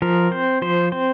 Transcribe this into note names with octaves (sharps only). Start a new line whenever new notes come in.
F3 A#4
C4 C5
F3 C5
C4 C5